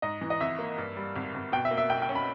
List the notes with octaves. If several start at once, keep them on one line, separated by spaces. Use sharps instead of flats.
G#2 D#5
E3
D#5
G#1 E5
A#3
G2
G3
G#1
G#1
B2 G5
E5
A#3
E5
B1 G5
G5
C#4
B5